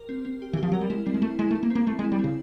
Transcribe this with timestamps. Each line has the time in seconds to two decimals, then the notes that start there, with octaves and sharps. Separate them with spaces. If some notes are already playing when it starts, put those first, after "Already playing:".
Already playing: G4 A#4
0.09 C4
0.25 C4
0.42 G4
0.53 E3
0.57 G4
0.63 F3
0.72 F#3 A#4
0.81 G3
0.90 G#3 E4
1.06 G3 C4
1.14 G#3
1.22 A3 E4
1.39 G#3 E4
1.51 A3
1.55 E4
1.63 A#3
1.70 C4
1.75 A#3
1.86 A3 C4
1.99 G#3
2.04 E4
2.12 G3
2.19 C4
2.24 C#3